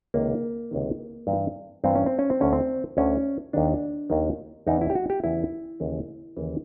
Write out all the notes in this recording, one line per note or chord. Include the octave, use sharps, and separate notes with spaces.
C#2 C3 D#3 A#3
C#2 C3 D#3
G2 E3
G2 E3 C4
C#4
C4
C#4
C4
D2 D3 C#4
C4
D2 D3 C#4
D#2 D#3 D4
D#2 D#3
E2 C#3 E3 D#4
E4
G4
F#4
G4
E2 C#3 E3 E4
D#2 C#3 E3
D#2 C#3 E3